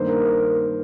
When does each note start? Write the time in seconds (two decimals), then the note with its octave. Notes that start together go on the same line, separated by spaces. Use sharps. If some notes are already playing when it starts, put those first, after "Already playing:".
Already playing: G2 D#3 A#3 C5
0.09 A#4
0.26 A#4
0.58 A#4